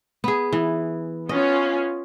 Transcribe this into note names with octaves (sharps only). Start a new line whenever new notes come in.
B3 G#4
E3
B3 C#4 F4 D#5